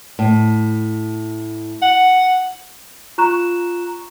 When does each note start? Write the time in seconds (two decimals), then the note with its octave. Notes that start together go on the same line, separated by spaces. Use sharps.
0.19 A2
1.82 F#5
3.18 F4 A#5 C#6 F#6 E7